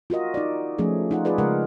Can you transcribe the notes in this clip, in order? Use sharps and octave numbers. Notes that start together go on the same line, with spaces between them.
F4 F#4 A#4 D#5
D#4 D5
F3 A3 C#4 G#4
D#4 F4 F#5
D#4 F4 G#4 B4 D5
C#3 G#3 A#4 F#5